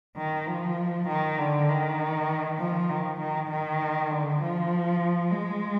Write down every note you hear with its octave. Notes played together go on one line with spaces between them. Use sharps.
D#3
F3
D#3
D3
D#3
F3
D#3
D#3
D#3
D3
F3
G#3